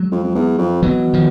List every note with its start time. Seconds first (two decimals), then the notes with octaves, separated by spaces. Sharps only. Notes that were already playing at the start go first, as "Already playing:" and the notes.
Already playing: F#3 G#3
0.12 F2
0.24 F2
0.35 E2
0.58 F2
0.82 B2 E3 F#3
1.13 D#3 F3